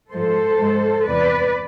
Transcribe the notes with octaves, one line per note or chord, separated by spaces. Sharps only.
G#2 F3 G#3 A4 C5
G#2 G#3
E2 C3 B4 D5